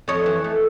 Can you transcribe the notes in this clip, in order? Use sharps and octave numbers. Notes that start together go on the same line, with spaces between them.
F2 C#5 D#5
E3
A3